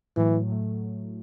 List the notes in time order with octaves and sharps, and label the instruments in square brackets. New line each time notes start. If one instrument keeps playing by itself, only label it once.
[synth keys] A2 F#3 A3 [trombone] E3
[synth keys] A2 F#3 A3